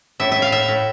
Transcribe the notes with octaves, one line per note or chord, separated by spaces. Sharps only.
A2 E5
A2 E5
F5
A2 E5
A2